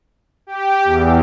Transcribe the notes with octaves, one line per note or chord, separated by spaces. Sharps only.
G4
E2